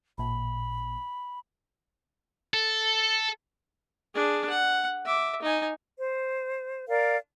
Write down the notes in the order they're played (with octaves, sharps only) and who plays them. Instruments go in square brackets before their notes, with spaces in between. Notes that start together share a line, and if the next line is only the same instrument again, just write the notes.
[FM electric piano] A1 A#2 [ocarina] B5
[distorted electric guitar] A4
[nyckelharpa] D4 G#4
F#5
E5 D6
D#4 G#5
[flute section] C5
A#4 D5 F5